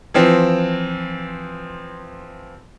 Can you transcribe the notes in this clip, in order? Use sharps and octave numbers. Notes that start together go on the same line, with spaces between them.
E3 F3 C4